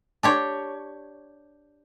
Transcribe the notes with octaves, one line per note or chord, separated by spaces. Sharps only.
D4 G4 C#5